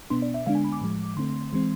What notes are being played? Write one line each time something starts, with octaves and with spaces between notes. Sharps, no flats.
B2 B3 D4 C6
D5
E5
D3 G#3 B3 D4 F5
G#5
B5
D6
A2 F3 G#3
D3 A3 C4 C6
E3 G#3 C4